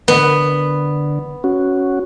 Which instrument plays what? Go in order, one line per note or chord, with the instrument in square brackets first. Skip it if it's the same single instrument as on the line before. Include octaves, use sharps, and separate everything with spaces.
[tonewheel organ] D3 [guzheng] B3
[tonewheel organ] C#4 F#4